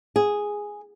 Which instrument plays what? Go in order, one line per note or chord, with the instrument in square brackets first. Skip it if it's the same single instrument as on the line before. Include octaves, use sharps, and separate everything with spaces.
[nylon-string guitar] G#4